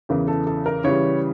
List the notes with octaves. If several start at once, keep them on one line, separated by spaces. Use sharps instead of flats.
E2 C#3 E3 A#4
A4
A4
A#4
C#3 E3 G3 C#5